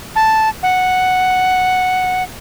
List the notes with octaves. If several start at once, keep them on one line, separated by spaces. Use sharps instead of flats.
A5
F#5